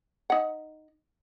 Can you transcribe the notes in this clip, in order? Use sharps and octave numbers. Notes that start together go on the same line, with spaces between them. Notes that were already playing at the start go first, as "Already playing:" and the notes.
D#4 F#5